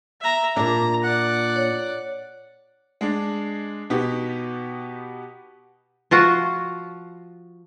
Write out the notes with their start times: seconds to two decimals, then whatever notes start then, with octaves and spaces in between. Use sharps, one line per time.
0.21 E5 A#5
0.57 A#2 D4 A#5
1.04 D5 F#5
1.56 C#5
3.01 G#3 D4
3.90 B2 B3 D#4 G4
6.11 F3 F4 F#4